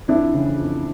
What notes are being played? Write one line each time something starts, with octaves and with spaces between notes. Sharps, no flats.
F2 D4 E4
C#3 E3
F2